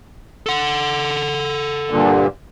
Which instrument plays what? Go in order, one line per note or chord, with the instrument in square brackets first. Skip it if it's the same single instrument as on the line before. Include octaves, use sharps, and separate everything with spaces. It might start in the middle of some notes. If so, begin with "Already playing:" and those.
[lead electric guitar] A4 F#5
[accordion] G2 A#2 D3